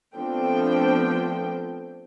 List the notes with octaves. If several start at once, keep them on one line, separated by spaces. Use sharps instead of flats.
F3 A3 B3 C4 D4 G5